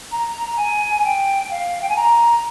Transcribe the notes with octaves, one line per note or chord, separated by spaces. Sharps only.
A#5
G#5
G5
F5
G5
G#5
A#5